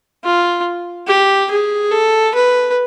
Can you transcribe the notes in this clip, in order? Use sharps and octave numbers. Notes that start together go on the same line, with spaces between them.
F4
G4
G#4
A4
B4